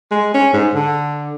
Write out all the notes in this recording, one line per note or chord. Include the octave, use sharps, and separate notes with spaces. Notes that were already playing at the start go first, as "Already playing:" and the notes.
G#3
C#4
G#2
D3